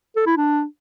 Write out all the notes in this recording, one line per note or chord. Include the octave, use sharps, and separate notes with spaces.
A4
E4
D4